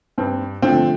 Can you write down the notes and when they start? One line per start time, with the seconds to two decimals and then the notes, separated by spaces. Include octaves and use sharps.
0.18 G2 C4
0.62 D3 F3 A3 C4